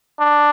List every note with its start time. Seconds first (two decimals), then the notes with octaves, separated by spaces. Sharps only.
0.20 D4